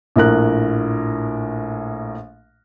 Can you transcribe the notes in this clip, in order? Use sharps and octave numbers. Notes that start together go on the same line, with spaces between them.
A#1 A2 A#4 F#6